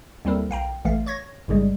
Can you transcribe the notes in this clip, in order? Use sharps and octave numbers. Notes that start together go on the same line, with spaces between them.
D#2 G3 C4 E4 A4 A#4
B1 F5 G5 A#5
A1 E3 A3 F5
C#5 C#6 G#6 A#6
A1 G#2 C#3 G3 G#3